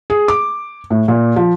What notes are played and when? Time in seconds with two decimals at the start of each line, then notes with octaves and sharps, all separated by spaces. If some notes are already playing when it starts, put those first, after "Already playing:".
0.10 G#4
0.28 D6
0.90 A2
1.08 A#2
1.36 F3